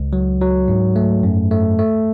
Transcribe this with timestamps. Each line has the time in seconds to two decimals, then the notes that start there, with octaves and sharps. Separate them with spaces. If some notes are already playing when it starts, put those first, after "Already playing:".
Already playing: C#2
0.13 F#3
0.41 F#3
0.68 G#2
0.96 A3
1.23 F#2
1.51 A3
1.79 A3